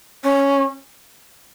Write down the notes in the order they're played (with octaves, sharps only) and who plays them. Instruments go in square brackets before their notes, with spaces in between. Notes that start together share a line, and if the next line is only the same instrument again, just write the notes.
[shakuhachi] C#4